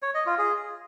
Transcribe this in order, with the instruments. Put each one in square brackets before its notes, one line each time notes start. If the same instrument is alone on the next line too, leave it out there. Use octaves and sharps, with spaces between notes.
[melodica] C#5
D#5
F4
G#4